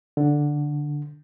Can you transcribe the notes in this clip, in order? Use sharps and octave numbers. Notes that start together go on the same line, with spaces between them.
D3